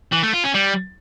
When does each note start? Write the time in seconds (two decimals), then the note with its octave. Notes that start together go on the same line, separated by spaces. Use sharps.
0.13 E3
0.23 A3
0.34 F4
0.44 C#4
0.54 G3